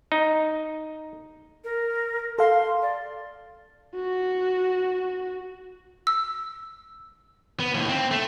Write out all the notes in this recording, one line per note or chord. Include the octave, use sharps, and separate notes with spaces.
D#4
A#4
A4 F5 C6
D5
F#4
E6
B3
D#2 A2
C4
A3